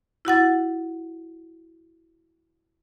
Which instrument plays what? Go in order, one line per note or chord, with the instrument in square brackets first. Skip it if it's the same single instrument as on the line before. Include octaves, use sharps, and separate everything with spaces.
[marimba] E4 F#4 F#5 A6